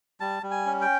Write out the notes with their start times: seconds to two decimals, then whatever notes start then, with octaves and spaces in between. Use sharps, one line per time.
0.20 G3 A5
0.43 G3
0.51 G#5
0.66 C#4
0.81 G5